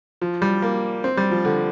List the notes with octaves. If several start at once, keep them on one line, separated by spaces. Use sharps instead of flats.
F3
G3
A#3
C4
G3
F3
D3